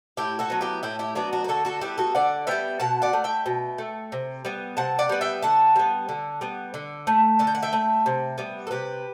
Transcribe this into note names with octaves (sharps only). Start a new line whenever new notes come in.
A2 E4 G4
F#4 A4
F#3 B3
E4 G4
A2 E4 G4
E4 G4
F#3 B3 D4 F#4
D4 F#4
B4
D3 F#4 A4
F#4 A4
G3 B3 E4 G4
F#4 A4
D3 D5 F#5
G3 B3 E5 G5
B2 F#5 A5
D5 F#5
A3
E5 G5
B2
A3
C3
G3 B3
C3 F#5 A5
D5 F#5
G3 B3
E5 G5
D3 F#5 A5
G3 B3
D3
G3 B3
D3
A3
D3 A5
G5
F#5
E5 G5
A3
C3
G3 B3
A4
C3 G4 B4